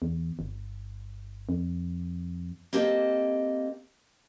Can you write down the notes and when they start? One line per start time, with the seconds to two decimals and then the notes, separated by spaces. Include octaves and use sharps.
0.02 E2
0.39 G1
1.49 F2
2.73 A#3 C4 G4 A4 D#5